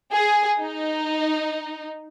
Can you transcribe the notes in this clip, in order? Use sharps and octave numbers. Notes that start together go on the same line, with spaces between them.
G#4
D#4